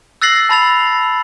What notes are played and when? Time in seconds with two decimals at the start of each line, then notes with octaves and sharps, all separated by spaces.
0.22 E6 F#6 A6 A#6 C7 F#7
0.49 A5 B5 A6 F7